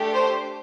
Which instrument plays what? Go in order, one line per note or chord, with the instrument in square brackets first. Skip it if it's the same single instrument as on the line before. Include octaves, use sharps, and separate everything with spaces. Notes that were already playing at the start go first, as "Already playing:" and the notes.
Already playing: [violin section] A3 D4 G4
C5